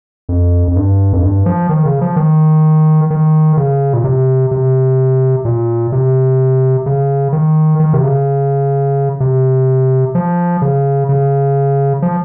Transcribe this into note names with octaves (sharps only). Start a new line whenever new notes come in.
F2
F2
G2
F2
G2
F3
D#3
C#3
F3
D#3
D#3
C#3
A#2
C3
C3
A#2
C3
C#3
D#3
D#3
C3
C#3
C3
F3
C#3
C#3
F3